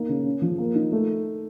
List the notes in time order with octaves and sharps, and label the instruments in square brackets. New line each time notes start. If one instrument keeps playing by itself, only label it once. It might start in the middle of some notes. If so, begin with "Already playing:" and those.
Already playing: [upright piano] A#3 D#4
C#3
C#4
F3
A#3
D#4
A3